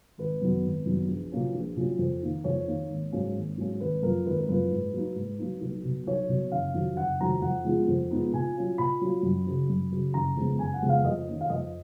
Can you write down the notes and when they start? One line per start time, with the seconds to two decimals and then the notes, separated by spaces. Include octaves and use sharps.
0.18 G#1 B4
0.42 F#2 D#3 F#3 B3
0.64 G#1
0.86 F#2 D#3 F#3 B3
1.09 A#1
1.32 A#2 F#3 A#3 C#4
1.55 A#1
1.76 A#2 F#3 A#3 C#4
1.99 F2
2.22 D#3 A#3 D#4
2.44 F2 C#5
2.67 D#3 A#3 D#4
2.90 G#1
3.12 G#2 F#3 A#3 C#4
3.35 G#1
3.57 G#2 F#3 A#3 C#4
3.80 G#1 B4
4.03 F#2 F3 A#3 A#4
4.26 G#1 B4
4.38 A#4
4.49 F#2 F3 A#3 B4
4.71 G#2
4.93 F#3 A#3 D#4
5.16 G#2
5.38 F#3 A#3 D#4
5.61 B1
5.84 B2 F#3
6.07 B1 C#5
6.29 B2 F#3
6.52 F#1 F5
6.74 F2 D#3 F#3
6.97 F#1 F#5
7.21 F2 D#3 F#3 A#5
7.42 F2 F#5
7.65 F3 G#3 B3 D#4
7.88 F2
8.11 F3 G#3 B3 D#4
8.33 A#2 G#5
8.55 F#3 C#4 F4
8.78 A#2 B5
9.01 F#3 C#4 F4
9.23 F#2
9.47 C#3 F#3
9.69 F#2
9.92 C#3 F#3
10.14 F#1 A#5
10.37 F2 C#3 G#3 B3
10.59 F#1 G#5
10.74 F#5
10.82 F2 C#3 G#3 B3
10.89 F5
11.04 F2 D#5
11.28 D#3 A#3 C#4
11.41 F5
11.50 F2 D#5